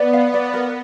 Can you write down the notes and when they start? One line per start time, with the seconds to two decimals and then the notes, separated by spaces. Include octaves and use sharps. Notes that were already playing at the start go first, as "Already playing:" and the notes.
Already playing: B3 D5
0.13 F5
0.34 D5
0.54 A#4